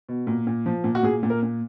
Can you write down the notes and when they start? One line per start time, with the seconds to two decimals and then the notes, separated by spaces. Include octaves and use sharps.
0.09 B2
0.27 A#2
0.47 A#2
0.66 F3
0.84 A#2
0.95 F#4
1.03 A#2 G#4
1.23 A#2
1.30 A#4
1.43 A#2